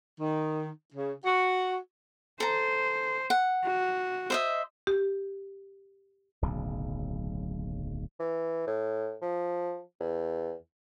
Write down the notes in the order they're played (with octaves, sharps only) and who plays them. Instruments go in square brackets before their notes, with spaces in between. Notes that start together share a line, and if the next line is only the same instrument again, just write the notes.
[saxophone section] D#3
C#3
F#4
[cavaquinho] A4 A#5 [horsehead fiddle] C5
[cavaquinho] F#5
[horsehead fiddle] F#4
[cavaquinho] C5 D#5 E5
[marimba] G4
[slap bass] D1 B1 C#3
[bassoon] E3
A2
F3
E2